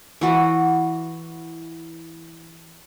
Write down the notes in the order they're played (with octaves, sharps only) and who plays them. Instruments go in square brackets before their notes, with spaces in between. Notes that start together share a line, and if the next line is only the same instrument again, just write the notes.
[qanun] E3 F#4